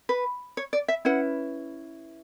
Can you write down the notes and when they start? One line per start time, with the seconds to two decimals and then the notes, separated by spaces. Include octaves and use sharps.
0.09 B4
0.57 C#5
0.73 D5
0.88 E5
1.05 C#4 E4 B4 F#5